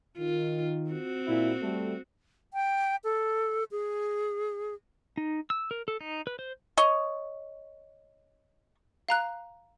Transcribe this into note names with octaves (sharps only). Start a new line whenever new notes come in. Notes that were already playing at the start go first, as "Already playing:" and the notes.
D#3 F4
C4 F#4
A#2 E4
G3 A3
G5
A4
G#4
D#4
E6
A#4
A4
D#4
B4
C5
C#5 D#5
F5 A#5 F#6